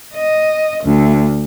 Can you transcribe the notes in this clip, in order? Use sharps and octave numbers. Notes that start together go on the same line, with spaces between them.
D#5
D2